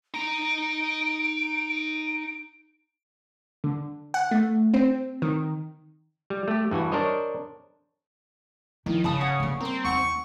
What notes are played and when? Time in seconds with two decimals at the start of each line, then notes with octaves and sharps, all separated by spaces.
0.14 D#4 A#5 D7
3.64 D3
4.14 F#5
4.31 A3
4.74 C4
5.22 D#3
6.30 G3
6.48 A3 G4
6.71 G2 E3 F#4 G#5
6.92 D4 A#4 C5 C#5 D#5
8.86 D#3 F3 E4
9.04 G1 C#3 B4 A5 D#6
9.21 C#5 F#5 D#6
9.40 G3 A#3
9.61 C4 A#4 C6
9.85 D#2 A#3 F#5 C#6